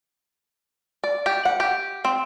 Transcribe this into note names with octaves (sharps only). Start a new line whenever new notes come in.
D5
G4
F#5
G4
C4